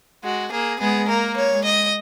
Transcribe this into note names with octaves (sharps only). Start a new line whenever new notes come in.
G#3 F#4
A#3 G#4
G#3 B3 G#4
A#3 A#4
C#5
G#3
D#5